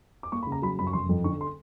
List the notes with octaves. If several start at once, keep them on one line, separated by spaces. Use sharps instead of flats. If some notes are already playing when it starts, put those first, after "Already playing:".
D6
A#3 C#6
B5
C#3
A#5
F#3 B5
F#2 B5
C#6
F1 C6
F2
D3 C#6
C6